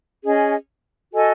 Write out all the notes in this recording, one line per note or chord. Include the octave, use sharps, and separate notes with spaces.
C#4 G#4 D#5
F#4 A4 D#5 G#5